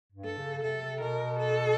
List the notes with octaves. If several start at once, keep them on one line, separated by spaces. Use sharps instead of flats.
G2
A4
C#3
C3 A4
B2 A#4
A4